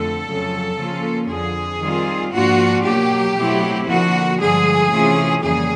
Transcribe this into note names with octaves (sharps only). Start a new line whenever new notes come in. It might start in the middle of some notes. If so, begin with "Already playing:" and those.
Already playing: F2 D3 A3 A4
F2 C#3 F#3
C#3 F3 A#3 C#4 F4
F2 D3 F3 G#4
D#3 G3 C4 F4
G#2 F3 A#3 D4 F4 F#4
B2 F#3 A#3 G4
B2 F#3 A3 C4 E4
D3 F3 A#3 F#4
G2 D3 F3 G#3 G#4
C3 E3 A3 C#4 F4
F2 C#3 E3 G3 A#3 G#4